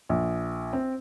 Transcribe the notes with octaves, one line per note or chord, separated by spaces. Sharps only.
A#1
C4